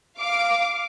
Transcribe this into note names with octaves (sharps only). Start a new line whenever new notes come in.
F5 D6